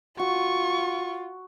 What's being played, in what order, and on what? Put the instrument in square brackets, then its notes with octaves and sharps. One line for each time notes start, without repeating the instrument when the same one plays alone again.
[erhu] F4 [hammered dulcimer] F#4 [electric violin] C#6